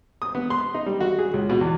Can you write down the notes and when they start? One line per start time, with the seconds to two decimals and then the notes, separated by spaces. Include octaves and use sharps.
0.22 D#6
0.35 B3
0.50 C6
0.74 D#4
0.86 G3
1.01 F#4
1.19 G#4
1.34 C#2
1.50 B2
1.61 E2